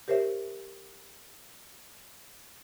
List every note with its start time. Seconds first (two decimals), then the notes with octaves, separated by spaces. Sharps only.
0.08 G4 A#4 C5 C#5 E5